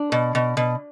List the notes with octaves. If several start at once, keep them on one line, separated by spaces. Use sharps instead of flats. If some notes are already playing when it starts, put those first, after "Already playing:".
Already playing: D4
B2
B2
B2